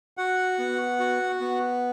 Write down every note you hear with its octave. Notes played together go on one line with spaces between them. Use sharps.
F#4 F#5
B3
F#4
B3